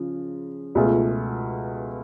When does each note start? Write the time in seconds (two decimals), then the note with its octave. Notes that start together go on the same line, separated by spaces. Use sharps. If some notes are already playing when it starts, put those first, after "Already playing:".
Already playing: C#3 F3
0.75 C#2 B2 A3 F4 G#4